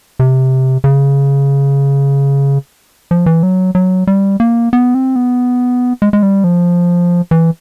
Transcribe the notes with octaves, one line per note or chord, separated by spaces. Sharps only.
C3
C#3
F3
E3
F#3
F#3
G3
A#3
B3
C4
B3
G#3
G#3
G3
F3
E3